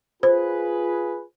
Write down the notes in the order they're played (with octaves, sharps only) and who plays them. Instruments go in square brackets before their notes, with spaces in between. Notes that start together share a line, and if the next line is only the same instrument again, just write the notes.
[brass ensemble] F4 G#4 B4 [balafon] C5